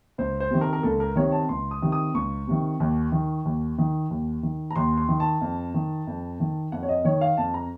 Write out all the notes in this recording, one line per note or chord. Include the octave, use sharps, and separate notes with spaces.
C#2 C5
C5
C3 D#3
A#4
A#4
C#2 A4
A#4
C3 D#3 C#5
A5
C#2 C6
D#6
C3 D#3
D#6
C#2 C#6
C3 D#3
D#2
D#3
D#2
D#3
D#2
D#3
A#5
D#2 C6
C6
D#3
A5
F2
D#3
F2
D#3
F2 F#5
C#5
D#5
D#3 C#5
F5
F2 A5
A#5